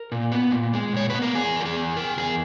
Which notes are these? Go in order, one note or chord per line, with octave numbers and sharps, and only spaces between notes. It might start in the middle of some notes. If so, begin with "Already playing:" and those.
Already playing: A#4
A#2
B3
A#2
G#3
A#2 C#5
B4
B3
A#4
E2 G#4
E3 A#4
G#4
E2
C#3 A#4
E2 G#4